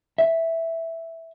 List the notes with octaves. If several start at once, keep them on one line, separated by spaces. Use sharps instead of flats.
E5